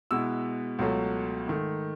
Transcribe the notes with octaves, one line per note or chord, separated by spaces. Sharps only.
B2 G#3 B3 E4 E6
C#2 B2 F#3 A3
G#2 D#3 A3